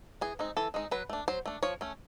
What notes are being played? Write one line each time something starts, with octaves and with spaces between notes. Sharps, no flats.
E3 G#4
G#3 C4 D#4
E3 A4
G#3 C4 D#4
F#3 B4
A3 D4
F#3 C5
A3 D4
F3 C#5
A3 C#4